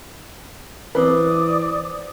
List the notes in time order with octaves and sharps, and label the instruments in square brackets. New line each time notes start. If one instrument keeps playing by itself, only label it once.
[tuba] E3 [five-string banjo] C4 B4 [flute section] D5 D6 D#6